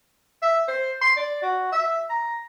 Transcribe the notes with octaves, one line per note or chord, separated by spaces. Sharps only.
E5
C5
C6
D5
F#4
E5
A#5